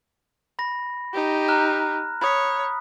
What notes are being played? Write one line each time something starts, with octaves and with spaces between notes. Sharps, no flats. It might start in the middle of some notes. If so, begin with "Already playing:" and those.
B5 A#6
D#4 G4
A#5 F6 F#6
C#5 B5 D#6 B6